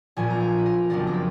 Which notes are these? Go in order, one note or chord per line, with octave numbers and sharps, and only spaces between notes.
A#1 A#2 F3 B3 G#5
A#5
G#5
B4
A#4
F#1 F2 F3 B3 D4 A#4
A#4
B4